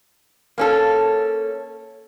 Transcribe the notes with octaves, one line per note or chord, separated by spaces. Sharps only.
A#3 C#4 A4